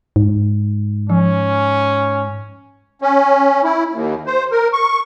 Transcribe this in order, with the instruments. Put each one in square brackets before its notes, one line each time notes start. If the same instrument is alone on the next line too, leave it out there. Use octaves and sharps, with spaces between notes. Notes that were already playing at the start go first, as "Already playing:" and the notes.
[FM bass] G#2
[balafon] F3 [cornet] C#4
[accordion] C#4
E4
D#2
C5
A#4
C#6